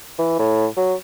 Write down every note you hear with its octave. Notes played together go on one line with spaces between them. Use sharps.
E3
A2
F#3